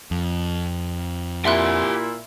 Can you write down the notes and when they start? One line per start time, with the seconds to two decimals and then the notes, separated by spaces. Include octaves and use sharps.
0.11 F2
1.45 A#2 E4 G4 E5 F#5 C6 F#6